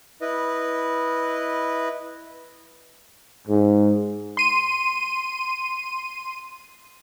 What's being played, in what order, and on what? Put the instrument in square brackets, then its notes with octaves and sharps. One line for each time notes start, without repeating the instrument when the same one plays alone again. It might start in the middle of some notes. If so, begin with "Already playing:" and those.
[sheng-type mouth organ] E4 B4 D#5
[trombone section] G#2
[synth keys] C6 D#7